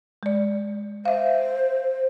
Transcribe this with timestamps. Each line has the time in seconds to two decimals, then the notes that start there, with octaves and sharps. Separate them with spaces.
0.23 G#3 D5
1.05 C5 E5 F5